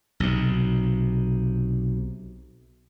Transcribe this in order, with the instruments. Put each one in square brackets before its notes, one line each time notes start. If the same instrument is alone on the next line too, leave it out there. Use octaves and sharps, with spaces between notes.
[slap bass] B1 C3